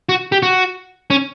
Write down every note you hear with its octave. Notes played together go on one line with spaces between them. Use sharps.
F#4
G4
F#4
C#4